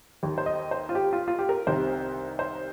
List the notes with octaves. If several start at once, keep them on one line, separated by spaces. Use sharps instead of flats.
D#2 D#3
C5
D#5
C5
F4
G4
F4
F4
G4
A#4
C2 C3 D#3 C5
C5